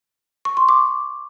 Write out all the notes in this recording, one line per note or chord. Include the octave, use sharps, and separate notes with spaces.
C#6
C6
D6